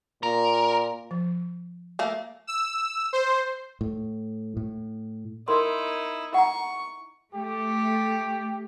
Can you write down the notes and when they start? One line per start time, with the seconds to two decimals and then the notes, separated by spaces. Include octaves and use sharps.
0.23 A#2 A#4
1.11 F3
1.99 A3 A#3
2.47 E6
3.13 C5
3.81 A2
4.57 A2
5.48 D#4 E4 A#4 C6
6.34 F#5 A#5 C#6
7.34 A3 G4